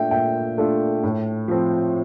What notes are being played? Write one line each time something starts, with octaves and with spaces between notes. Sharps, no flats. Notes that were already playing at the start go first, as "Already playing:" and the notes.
Already playing: A#2 A3 D4 F4 E5 G5
A#2 E5 G5
A3 D4 F4
A2
F3 C4